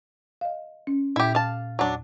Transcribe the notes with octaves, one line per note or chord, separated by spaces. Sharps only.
D#5 F5
C#4
A#2 E4 G4
F5 A5
E2 F#3 D4